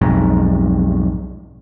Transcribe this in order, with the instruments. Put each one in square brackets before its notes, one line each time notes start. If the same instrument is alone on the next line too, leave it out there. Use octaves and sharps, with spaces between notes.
[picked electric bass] B1 F2 G#2